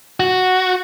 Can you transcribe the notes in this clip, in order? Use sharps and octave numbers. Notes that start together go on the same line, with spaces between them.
F#4